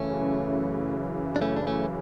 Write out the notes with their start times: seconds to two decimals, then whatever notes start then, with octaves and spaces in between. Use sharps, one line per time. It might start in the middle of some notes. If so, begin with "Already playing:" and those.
Already playing: F#2 C#3 E3 A3 C#4
1.36 D4
1.42 A3 C#4
1.56 D4
1.67 A3 C#4